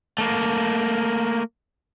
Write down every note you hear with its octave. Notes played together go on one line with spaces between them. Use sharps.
A3 A#3